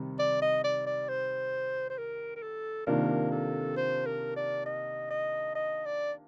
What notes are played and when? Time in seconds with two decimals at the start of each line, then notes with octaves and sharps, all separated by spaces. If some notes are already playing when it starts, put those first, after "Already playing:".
Already playing: C3 D#3 G3
0.19 D5
0.42 D#5
0.64 D5
0.86 D5
1.09 C5
1.90 C5
1.98 A#4
2.36 A#4
2.43 A4
2.87 C3 D#3 A#3 D4 F4 A#4
3.32 A4
3.76 C5
4.06 A#4
4.36 D5
4.66 D#5
5.10 D#5
5.55 D#5
5.85 D5